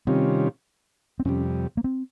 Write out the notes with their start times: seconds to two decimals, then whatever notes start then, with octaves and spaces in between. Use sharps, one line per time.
0.07 C3 D#3 G3 C4 C#4 F4
1.20 C4
1.25 F2 C3 G3 C#4
1.77 A#3
1.84 C4